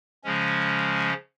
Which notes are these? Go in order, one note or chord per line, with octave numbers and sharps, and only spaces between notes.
C#3 F3 G#3 C#4